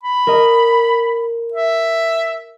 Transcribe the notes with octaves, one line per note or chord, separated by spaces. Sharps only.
B5
A#4 D#5
E5